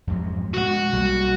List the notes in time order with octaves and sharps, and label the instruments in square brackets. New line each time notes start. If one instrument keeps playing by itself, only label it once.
[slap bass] F2 G#2 F#3
[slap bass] B2 G#3 [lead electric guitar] F#4 F#5
[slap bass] B1 G3 A#3